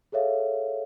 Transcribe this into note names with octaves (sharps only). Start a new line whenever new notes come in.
G#4 A4 C#5 E5 F5